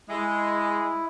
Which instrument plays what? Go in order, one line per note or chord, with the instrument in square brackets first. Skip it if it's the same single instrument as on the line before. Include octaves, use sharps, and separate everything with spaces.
[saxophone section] G#3 [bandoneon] E4